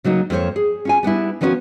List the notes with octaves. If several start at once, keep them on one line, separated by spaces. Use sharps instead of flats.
C#3 F#3 A#3 D#4
F2 A#3 E4 C5 C#5
G#4
C#4 F4 G#5
G3 B3 D4 E4
D#3 F3 B3 C#4 D#4 F#4